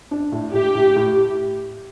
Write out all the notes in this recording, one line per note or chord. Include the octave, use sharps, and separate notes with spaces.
D4
A2
A2 G4
A2
A2